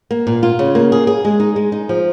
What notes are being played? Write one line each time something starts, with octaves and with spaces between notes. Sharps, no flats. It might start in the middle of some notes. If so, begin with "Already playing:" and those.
A#3
A#2
F4
C#3
A#3
G#4
G#4
G#3
D#4
G#3
D#4
F3